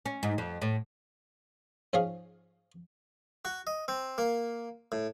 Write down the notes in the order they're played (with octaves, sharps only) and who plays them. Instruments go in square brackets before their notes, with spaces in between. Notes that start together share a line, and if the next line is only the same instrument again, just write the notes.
[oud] C#4
G#2
F2
A2
[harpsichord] G#2 F3 C#4 G#4 F5
F#4
D#5
C4
A#3
A2